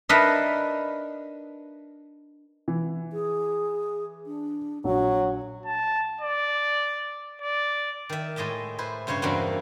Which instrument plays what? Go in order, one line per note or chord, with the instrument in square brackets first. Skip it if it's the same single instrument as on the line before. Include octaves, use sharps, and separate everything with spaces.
[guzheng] D4 D#4 A#4 B4 E5
[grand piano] E3
[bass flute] G#4
D4
[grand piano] A#1 [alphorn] F#3 [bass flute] F#4
[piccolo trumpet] A5
D5
D5
[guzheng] D#3 E5
A2 G#3 D#5 E5 A5
E4 B4 C5
G2 C#3 C5 C#5 E5
E2 G2 G3 A#3 C4 F#4